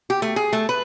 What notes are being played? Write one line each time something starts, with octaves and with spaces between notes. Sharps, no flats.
G4
A3
G#4
A3
B4